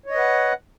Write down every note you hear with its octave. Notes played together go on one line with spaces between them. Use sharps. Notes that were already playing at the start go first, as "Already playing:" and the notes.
B4 C#5 D#5 F#5